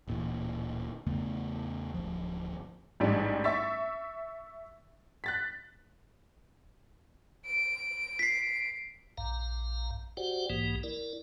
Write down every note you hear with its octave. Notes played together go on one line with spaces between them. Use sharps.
D1 A#2 E3
E2 C#3 A3 B3
D1 G1 F3
A1 G#2 G3 D4
E5 C#6 E6 A6 B6
F#6 A6 B6
D7
B6 C7
A#1 G2 F5 A#5
F#4 G4 C5 D5 F#5 G5
B1 G#2 E3 A#3 G4
E4 A#4 D5